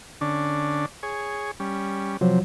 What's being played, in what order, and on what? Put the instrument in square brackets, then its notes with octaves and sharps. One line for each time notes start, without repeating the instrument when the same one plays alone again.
[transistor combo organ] D3 C#4 D4
G#4 C#5
G3 C#4
[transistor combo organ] C3 [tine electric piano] F3 F#3